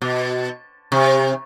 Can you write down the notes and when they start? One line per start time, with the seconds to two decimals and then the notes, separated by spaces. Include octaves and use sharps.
0.02 B2
0.92 C3